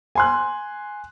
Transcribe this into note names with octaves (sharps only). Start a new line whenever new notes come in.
G#5 C6 F#6